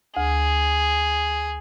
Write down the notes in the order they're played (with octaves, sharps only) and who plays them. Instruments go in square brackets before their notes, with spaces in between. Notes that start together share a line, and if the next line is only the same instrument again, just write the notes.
[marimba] D2 [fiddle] G#4